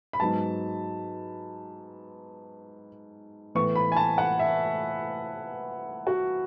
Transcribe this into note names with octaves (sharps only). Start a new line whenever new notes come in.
B5
G#2 F#3 B3 A5
A2 E3 B3 C#6
B5
G#5
A5
F#5
E5
F#4